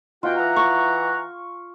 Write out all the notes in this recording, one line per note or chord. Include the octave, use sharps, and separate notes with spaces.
B2 F4 F#4 G5
E3 F#5 A#5
C#6